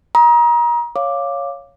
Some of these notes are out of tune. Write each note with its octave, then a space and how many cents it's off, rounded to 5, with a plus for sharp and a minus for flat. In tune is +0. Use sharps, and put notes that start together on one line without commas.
A#5 +30 D#6 +25
C#5 +0 F5 +0 D6 +0